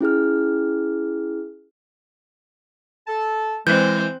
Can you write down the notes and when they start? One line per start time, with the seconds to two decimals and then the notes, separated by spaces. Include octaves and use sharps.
0.01 C#4 E4 G#4 F6
3.07 A4 A5
3.67 E3 G#3 C4 F#6 G6